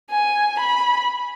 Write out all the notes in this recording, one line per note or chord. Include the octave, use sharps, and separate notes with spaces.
G#5
B5